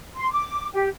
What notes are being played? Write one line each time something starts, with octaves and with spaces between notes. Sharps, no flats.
C6
D6
G4